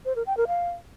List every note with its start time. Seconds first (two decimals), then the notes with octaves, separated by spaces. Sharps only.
0.05 C5
0.16 A#4
0.26 G5
0.37 A#4
0.48 F5